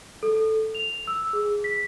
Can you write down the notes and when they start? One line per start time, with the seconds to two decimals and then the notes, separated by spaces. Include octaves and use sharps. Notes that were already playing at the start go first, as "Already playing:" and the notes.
0.23 A4
0.75 F7
1.07 E6
1.33 G#4
1.64 B6